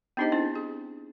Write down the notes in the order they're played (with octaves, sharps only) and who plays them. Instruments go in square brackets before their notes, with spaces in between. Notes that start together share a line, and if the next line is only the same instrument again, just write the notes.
[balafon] B3 D4 D#4 G4 C5 D#5
C4 D4 E4
G#4